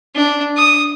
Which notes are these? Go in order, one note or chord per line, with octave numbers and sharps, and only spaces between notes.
D4
D#6